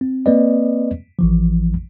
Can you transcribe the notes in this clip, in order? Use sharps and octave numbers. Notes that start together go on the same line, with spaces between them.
C4
A#3 C4 B4 D5 D#5
A1 E3 F3